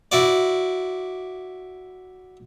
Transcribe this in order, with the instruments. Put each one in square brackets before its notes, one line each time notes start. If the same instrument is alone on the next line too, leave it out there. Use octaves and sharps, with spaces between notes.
[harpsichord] E4 F#4 D5